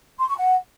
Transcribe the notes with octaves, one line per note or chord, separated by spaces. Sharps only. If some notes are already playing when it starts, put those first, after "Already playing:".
C6
C#6
F#5